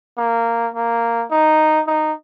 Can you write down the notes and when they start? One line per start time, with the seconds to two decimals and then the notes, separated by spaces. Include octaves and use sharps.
0.18 A#3
0.74 A#3
1.31 D#4
1.87 D#4